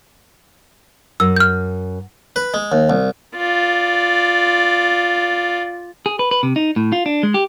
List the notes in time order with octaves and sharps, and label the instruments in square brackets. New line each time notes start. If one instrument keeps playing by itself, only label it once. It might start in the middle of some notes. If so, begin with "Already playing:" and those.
[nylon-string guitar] F#2 [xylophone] E6
[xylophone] F6 G6
[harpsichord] B4
G#3
D#2
C2
[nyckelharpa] F4 D5
[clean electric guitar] G#4
B4
B4
C3
D#4
A2
F4
D4
G#3
G4